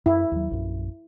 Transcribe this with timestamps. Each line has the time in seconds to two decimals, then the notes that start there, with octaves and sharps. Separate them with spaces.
0.06 F#2 E4
0.32 D#2 F#3
0.51 A#1 F#2